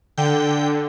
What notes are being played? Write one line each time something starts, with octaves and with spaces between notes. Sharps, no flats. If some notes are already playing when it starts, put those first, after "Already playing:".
D3 G5